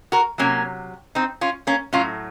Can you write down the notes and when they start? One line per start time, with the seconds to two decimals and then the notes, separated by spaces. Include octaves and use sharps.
0.12 F#4 A#4
0.38 C3 F#3 A#3 C#4
1.15 C4 D#4
1.41 C#4 F4
1.67 A#3 C#4
1.93 A2 F#3 A3 C#4 F4